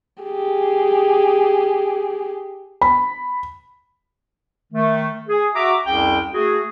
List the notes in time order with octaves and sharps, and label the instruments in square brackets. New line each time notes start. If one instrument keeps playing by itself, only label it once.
[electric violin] G4 G#4
[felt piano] B5
[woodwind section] D#3 A3
G#4
F#4 E5 A#5 D6
C2 F2 C#4 G#4 G5
A3 F#4 G#4